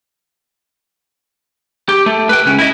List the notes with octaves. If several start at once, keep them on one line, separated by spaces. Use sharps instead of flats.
G4
A3
B4 G5
C#2 C#4
E4 D#5